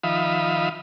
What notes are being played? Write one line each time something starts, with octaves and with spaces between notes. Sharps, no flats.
D#3 F3 E5 F5 B5 D#6